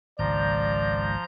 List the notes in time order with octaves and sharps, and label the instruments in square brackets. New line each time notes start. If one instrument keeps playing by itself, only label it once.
[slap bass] G#1 C#2 [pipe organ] F3 A#5 G6 [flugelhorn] D5